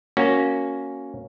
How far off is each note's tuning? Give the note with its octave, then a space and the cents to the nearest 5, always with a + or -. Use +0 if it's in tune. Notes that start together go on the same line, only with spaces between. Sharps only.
A#3 +0 C#4 +0 F#4 +0